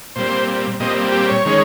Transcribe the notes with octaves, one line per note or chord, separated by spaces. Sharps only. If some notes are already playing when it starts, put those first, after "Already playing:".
A#2 G3 C4 C5
A#2 G3 C4 D#5
G4
C#5
D#3 G#3 C#4